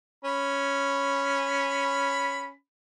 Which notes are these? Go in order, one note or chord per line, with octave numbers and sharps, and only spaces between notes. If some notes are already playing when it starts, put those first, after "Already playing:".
C#4 B5